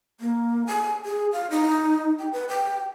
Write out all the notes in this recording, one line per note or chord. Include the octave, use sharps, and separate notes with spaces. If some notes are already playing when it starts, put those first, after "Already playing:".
A#3
G#5
G#4
F5
D#4
G5
B4
G5